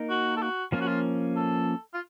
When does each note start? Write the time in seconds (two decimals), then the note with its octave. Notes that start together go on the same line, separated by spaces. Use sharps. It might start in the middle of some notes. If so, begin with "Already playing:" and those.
Already playing: A#3 D#4 A#4
0.10 F#4
0.37 A4
0.42 F#4
0.72 F3 A#3 C#4 F4
0.81 F#4
0.88 F4
1.36 A4
1.94 F4